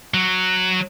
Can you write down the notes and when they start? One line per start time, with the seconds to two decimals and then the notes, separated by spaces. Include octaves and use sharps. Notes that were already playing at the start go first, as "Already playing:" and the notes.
0.14 F#3